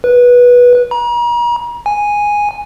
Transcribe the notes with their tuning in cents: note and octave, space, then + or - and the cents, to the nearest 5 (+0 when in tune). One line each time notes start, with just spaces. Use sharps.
B4 -15
A#5 +40
G#5 -5